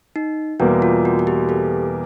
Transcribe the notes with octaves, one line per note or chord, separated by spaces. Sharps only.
D#4
E2 B2 G3 A#3 F#4
F4
F#4
F#4
G4
G4 A4